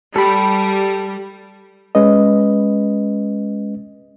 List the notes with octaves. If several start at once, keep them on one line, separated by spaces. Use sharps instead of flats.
G3 A4 B5
G#3 C#4 B4 D#5